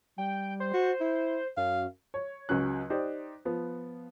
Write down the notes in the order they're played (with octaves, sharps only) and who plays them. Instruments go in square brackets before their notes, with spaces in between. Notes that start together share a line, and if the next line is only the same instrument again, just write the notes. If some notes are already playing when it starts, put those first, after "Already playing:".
[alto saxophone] G3 [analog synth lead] G5
[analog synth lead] C5
[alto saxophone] F#4
E4
[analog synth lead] F#2 [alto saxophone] F5
[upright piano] C#5
C#2 C#3 F#3 C#4 F#6
D#4 G4 C5 D5
F3 B3